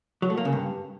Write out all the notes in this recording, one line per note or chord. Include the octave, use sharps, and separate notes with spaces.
F#3
A3
A#3
C#3
G2